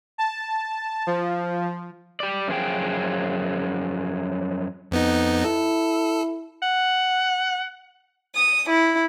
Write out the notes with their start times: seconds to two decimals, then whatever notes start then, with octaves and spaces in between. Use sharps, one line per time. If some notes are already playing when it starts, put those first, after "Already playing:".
0.18 A5
1.07 F3
2.20 G4 D5
2.48 F#2 F3 G#4 G5
4.91 F2 B3 D#4
5.44 E4 A4
6.62 F#5
8.35 D#6
8.68 E4